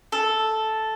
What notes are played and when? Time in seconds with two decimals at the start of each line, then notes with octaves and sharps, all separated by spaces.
0.12 A4